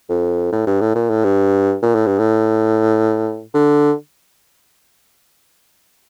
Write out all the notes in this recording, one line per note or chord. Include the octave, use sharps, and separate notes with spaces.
F2
A2
G2
A2
A#2
A2
G2
A#2
A2
G2
A2
D3